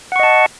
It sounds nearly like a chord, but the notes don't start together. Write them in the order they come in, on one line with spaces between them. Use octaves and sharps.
F#5 C#6 D#5 A5